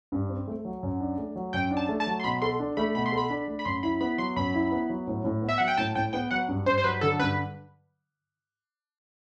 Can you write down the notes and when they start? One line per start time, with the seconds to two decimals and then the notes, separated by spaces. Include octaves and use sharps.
0.12 G2
0.29 C4
0.48 A3
0.65 F#3
0.83 F#2
1.00 D4
1.18 A3
1.36 F#3
1.53 F#2 G5
1.71 D4
1.77 A5
1.89 A3
2.00 A5
2.07 F#3
2.20 C6
2.24 B2 B5
2.42 A4 C6
2.59 D4
2.77 A3 B5
2.95 B2 B5
3.06 C6
3.12 A4
3.18 B5
3.30 D4
3.48 A3
3.59 B5
3.65 F#2 C6
3.83 E4 B5
4.01 B3 B5
4.18 F#3 C6
4.36 F#2 B5
4.54 E4
4.72 B3
4.89 F#3
5.07 A2
5.24 A2
5.42 B3
5.49 E5
5.58 F#3 F#5
5.68 G5
5.78 A2 A5
5.95 A2 G5
6.13 B3 G5
6.31 F#3 F#5
6.48 G2
6.66 G2 C5
6.78 C5
6.84 F#3 B4
7.01 D3 A4
7.19 G2 B4